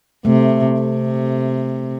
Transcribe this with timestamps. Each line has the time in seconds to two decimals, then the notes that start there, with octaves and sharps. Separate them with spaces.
0.25 C3 A3
0.80 C3